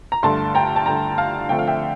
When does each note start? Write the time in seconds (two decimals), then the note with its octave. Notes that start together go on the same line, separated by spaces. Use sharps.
0.12 A#5
0.23 G2 D3 A3 A5 C6
0.55 G5 A#5
0.76 A5
0.86 G2 D3 A3 G5 A#5
1.18 F5 A5
1.49 D3 F3 A3 C4 G5
1.59 F5
1.67 E5 G5